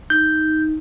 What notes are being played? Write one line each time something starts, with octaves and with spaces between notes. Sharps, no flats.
D#4 G6